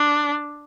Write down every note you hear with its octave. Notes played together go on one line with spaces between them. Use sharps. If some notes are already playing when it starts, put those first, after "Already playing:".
Already playing: D4